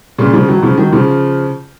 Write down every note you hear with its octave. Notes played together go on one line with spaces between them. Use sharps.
A#2 C#3
C#3 F3
D#3 F#3
C#3 F3
D#3 F#3
C#3 F3